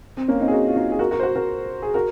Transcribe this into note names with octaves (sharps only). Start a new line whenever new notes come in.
C4
A#3 C#4
C4 D#4
G#4
D#4 F#4
F4
D#4 F#4
G#4
F#4 A#4
F#4 A#4
C5
F#4 A#4
F#4 A#4
G#4
F#4 A#4